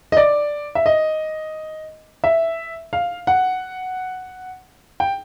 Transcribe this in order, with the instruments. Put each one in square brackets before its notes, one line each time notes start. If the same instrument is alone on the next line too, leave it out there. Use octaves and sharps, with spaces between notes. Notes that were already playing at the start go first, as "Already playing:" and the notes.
[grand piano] D#5
D5
E5
D#5
E5
F5
F#5
G5